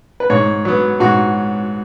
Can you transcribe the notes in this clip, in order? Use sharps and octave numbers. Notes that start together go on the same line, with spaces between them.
B4
G#2 C#5
F#3 B3
G#2 F#4